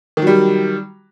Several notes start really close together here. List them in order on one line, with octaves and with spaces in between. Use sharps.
D#3 F#3 G3